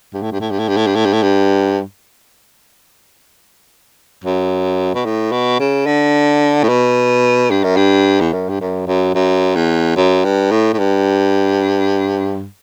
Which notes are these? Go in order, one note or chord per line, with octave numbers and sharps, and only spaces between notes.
G2
A2
G2
A2
G2
A2
G2
A2
G2
A2
G2
A2
G2
F#2
B2
A2
B2
C#3
D3
A2
B2
G2
F#2
G2
E2
F#2
G2
F#2
F#2
F#2
E2
F#2
G2
A2
A2
G2